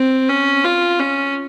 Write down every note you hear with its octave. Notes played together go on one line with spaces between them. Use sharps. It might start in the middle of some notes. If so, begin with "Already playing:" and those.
Already playing: C4
C#4
F4
C#4